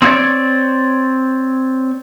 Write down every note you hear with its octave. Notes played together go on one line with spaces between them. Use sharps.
C4 D#4 F4 C#5 D5